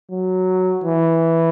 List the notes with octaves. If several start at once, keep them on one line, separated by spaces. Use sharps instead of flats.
F#3
E3